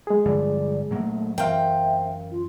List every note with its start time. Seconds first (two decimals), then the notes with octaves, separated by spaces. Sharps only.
0.07 G#3 G#4
0.26 G2 D3 F3 D5
0.91 A#2 F#3 A3 A#3
1.38 F#2 E3 C4 A#4 E5 F5 G5
2.31 F4